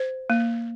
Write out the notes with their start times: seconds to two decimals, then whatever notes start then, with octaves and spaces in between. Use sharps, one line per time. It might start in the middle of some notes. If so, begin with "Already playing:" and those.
Already playing: C5
0.30 A#3